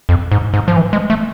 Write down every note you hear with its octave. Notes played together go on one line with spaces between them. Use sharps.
F2
G#2
G#2
F3
E3
G#3
A3